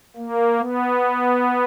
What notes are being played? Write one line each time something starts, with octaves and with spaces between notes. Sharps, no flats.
A#3
B3